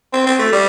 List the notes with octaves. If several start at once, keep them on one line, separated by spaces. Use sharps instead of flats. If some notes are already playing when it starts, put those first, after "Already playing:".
C4
C4
A3
G3